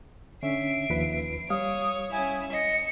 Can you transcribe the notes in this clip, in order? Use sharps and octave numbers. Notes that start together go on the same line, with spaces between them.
D3 C#4 E5 C7 D7
D#2 F3 B4
G3 C#5 F5 D#6
C#4 E4 G#5
D#5 C#7